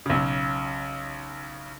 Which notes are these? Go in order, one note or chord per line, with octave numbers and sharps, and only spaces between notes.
B1 C#3